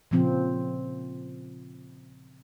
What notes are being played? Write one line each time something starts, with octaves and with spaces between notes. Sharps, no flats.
A#2 C#3 F3 C4